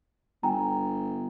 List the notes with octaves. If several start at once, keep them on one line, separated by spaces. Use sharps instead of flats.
G1 G5 G#5 A#5